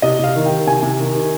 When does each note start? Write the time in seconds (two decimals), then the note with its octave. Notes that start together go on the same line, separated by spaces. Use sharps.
0.02 C3 D#5
0.19 C3 F5
0.35 D#3
0.46 G5
0.51 D#3
0.67 C3 G#5
0.83 C3
0.99 D#3
1.15 D#3